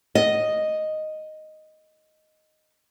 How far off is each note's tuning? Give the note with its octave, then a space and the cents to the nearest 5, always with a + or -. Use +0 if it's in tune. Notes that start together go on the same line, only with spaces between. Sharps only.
D#5 +0